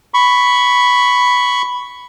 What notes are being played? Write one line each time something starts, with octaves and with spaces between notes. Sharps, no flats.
B5 C#6